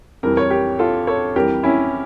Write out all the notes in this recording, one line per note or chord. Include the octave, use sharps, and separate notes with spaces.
F2 E3 G3 A#4
C#5
G4 A#4
F4 A4
A4 C#5
F2 E3 G3 G4 A#4
C#4 E4